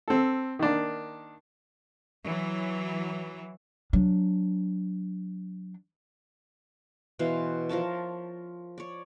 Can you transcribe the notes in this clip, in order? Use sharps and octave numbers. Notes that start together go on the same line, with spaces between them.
C4 A4
D#3 A#3 D4
E3 F#3
F#3 D4
B2 E3 C5 F5
F3 A#4 C#5 A5
C#5 D5